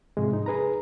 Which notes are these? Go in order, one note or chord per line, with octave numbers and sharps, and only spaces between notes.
G#2 C3 F3 G#3
D#4
G#4 B4 A#5